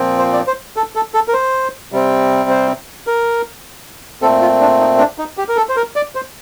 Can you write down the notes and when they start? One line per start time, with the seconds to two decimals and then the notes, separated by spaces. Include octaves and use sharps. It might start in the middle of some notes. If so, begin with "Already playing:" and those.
Already playing: A#2 F3 C4
0.19 C5
0.33 D5
0.47 C5
0.77 A4
0.95 A4
1.14 A4
1.28 A#4
1.33 C5
1.92 C3 G3 C4
2.50 C5
3.07 A#4
4.22 A#2 A3 C4 A4
4.42 F4
4.61 D4
4.80 D#4
4.99 D4
5.18 D#4
5.38 G4
5.48 A#4
5.57 A4
5.69 C5
5.77 A#4
5.96 D5
6.15 C5